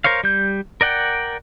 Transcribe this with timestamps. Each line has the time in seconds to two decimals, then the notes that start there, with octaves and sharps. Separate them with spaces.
0.04 A#4 C5 C#5 F5
0.24 G3 G6
0.81 A#4 D5 F#5 G5